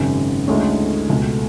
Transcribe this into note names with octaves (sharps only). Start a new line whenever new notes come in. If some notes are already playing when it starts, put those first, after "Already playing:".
Already playing: G#1 F#2 C#3
D2 D3 G#3 C#4 E4
C#2 B2 A3